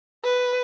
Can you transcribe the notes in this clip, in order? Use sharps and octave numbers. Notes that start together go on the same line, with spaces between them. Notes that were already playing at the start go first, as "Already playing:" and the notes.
B4